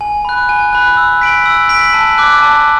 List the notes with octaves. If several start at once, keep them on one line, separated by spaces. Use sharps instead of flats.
G#5
B5 F#6
G#5
B5 F#6
E6
B6 D7 F#7
E6
B6 D7 F#7
A5
D6 F#6
A5